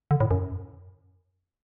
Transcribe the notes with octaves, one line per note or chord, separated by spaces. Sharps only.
D3
A2
F#2